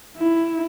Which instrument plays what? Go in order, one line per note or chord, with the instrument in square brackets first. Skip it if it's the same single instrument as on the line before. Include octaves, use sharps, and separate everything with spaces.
[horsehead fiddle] E4